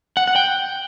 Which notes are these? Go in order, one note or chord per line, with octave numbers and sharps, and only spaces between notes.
F#5
F#5
G5